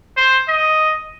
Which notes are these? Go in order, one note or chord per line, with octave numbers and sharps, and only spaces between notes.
C5
D#5